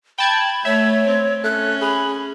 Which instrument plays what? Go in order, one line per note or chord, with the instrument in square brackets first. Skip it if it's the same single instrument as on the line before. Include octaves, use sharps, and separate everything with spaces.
[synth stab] G5 A5 G#6 [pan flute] B5
[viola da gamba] A3 [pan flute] C#5 [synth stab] E5
[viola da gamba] C4
[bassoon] A3 [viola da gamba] C#4 [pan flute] F#6
[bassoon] G#4 [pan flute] B5